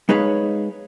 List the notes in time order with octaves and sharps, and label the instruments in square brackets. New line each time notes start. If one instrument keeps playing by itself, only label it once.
[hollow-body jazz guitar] G#3 D#4 G#4 B4 C#5 F5